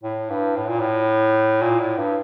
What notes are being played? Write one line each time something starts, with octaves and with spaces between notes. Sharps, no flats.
A2
G2
A2
A#2
A2
A#2
A2
G2